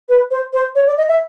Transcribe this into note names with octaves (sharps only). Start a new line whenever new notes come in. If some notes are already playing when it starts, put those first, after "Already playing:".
B4
C5
C5
C#5
D5
D#5
E5